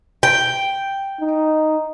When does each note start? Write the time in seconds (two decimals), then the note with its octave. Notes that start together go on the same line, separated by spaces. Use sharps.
0.23 G5
1.20 D#4